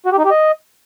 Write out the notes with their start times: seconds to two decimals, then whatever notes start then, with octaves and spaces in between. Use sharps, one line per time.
0.06 F#4
0.12 G4
0.18 D#4
0.25 G4
0.31 D#5